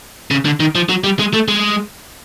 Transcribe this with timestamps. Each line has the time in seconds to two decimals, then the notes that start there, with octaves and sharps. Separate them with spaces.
0.31 C#3
0.45 D3
0.60 D#3
0.75 F3
0.89 F#3
1.04 G3
1.19 G#3
1.33 A3
1.48 G#3